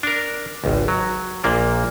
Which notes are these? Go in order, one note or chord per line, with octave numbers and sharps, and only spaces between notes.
D4 A#4
G#1 C#2
F#3
A#1 A#2 A#3 D4